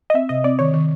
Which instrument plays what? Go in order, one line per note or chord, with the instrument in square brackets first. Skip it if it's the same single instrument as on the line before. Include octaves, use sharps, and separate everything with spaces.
[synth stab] D#5
[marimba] C4 [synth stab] E5
[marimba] C3 [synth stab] D#5
[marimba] C4 [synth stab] D5
[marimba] D#3 [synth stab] C#5
[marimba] D#3